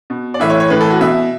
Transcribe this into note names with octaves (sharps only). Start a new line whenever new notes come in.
B2
D5
A2 E3 E5
C#5
C#5
A2 E3 B4
A4
F#4
B2 E5